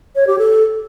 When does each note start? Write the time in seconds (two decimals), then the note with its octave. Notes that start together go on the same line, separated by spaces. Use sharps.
0.16 C#5
0.27 G4
0.39 A4